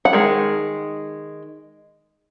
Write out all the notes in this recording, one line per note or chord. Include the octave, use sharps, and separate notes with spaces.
F#5
D#3 G#3